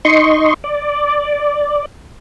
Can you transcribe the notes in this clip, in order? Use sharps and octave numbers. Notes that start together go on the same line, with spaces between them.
D#4 D#5 C6 C#6
D5